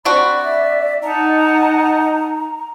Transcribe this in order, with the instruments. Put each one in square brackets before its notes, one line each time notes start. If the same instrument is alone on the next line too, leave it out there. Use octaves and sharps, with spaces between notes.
[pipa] C4 D4 F#4 [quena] D5 [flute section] B5
[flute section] E5
[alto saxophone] D#4 [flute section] D#5 F#5 A5 [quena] A#5